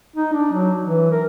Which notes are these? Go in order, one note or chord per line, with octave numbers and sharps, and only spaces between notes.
D#4
D4
F#3
E3
A#4